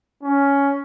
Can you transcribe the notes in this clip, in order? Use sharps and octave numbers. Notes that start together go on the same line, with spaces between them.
C#4